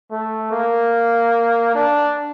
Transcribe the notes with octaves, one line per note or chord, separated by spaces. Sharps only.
A3
A#3
D4